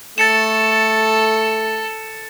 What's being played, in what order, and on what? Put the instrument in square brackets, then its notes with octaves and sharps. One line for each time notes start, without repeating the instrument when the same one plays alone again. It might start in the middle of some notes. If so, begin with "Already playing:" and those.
[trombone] A3 [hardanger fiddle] A4 [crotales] A6 C#7 E7